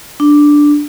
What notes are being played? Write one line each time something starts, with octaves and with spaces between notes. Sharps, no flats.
D4